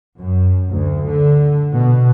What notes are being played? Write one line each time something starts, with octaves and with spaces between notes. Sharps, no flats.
F#2
D2
D3
B2